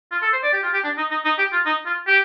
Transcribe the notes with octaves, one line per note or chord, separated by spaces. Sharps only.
F4
A4
C5
D5
G4
F4
G4
D4
D#4
D#4
D#4
G4
F4
D#4
F4
G4